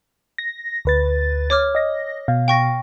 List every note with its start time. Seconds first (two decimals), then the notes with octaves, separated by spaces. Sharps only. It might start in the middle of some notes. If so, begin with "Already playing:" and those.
0.38 A#6
0.85 D2 B4 A6
1.50 C#5 D6 F6
1.75 D#5 A#6
2.28 B2 F5
2.48 G5 C#6 A#6